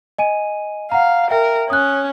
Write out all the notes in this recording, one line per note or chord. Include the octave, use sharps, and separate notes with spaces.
D#5 G#5 D#7
F5 F#5 A#5
A#4 E5 G5
C#4 D#6 F#6